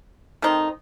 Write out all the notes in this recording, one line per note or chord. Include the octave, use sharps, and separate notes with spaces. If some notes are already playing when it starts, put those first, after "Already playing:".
D#3 A3 C4 D#4